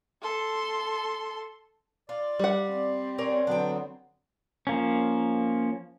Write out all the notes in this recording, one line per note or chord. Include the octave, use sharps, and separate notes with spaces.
A4 C6
F4 D5
G3 F#5
C4
A#4 C#5 D5 G#5
D3 F#3 B3 D4 G5
F3 A#3 C#4